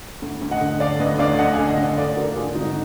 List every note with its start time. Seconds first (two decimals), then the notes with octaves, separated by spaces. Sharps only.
0.22 D2
0.41 D2
0.51 D#5 F#5
0.61 D3
0.80 D3 D5 F5
1.00 D2 B4 D#5
1.19 D2 D5 F5
1.39 D3 D#5 F#5
1.53 F5 G#5
1.58 D3
1.68 D#5 F#5
1.78 D2
1.83 D5 F5
1.98 D2 D5 F5
2.16 D3 F#4 A#4
2.36 D3 F4 G#4
2.55 G#1 D#4 F#4